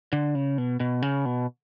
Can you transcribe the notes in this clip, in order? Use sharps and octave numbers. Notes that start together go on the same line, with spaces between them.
D3
C#3
B2
B2
C#3
B2